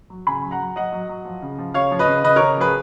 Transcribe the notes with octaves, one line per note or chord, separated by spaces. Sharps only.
F#3
C#3 G#5 B5
F#3
F#5 A#5
F#3
F#3 D#5 F#5
F#3
F#3
F3
C#3
F3
C#3 C#5 F5
F3
B4 D#5
C#3
C#3 B4 D#5
C#3 A#4 C#5
F3 G#4 B4